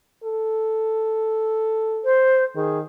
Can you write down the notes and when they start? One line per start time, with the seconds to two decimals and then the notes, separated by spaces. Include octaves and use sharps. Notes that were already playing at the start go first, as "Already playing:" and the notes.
0.24 A4
2.05 C5
2.56 D#3 G#4